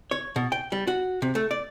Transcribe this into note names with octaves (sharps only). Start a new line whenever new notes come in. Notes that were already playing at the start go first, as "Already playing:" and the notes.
C#5
B2
G5
G3
F#4
C3
A3
D5